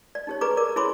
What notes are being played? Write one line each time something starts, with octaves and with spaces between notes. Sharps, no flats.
D5
D#4 G4 C#5
G#4 B4 D5 A#5 C#6 D6
A#4 D5 D6
E4 G#4 C#5 B5 C6 D6